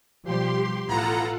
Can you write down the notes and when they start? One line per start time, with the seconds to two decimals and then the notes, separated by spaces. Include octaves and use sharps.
0.24 B2 F3 G3 G4 C6
0.89 A1 E3 B3 F4 A4 F#5 A#5